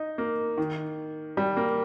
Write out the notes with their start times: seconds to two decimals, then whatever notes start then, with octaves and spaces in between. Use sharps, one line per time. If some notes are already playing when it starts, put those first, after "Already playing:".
Already playing: D#4
0.18 A#3
0.57 D#3
1.37 G3
1.57 A#3